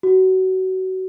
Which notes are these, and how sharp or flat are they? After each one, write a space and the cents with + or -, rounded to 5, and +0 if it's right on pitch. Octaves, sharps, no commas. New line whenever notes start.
F#4 +25